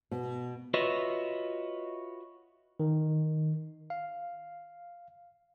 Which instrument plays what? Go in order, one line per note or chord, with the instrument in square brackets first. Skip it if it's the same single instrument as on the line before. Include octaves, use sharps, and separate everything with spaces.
[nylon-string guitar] B2
[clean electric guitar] F4 F#4 B4 C#5 D#5 E5
[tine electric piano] D#3
F5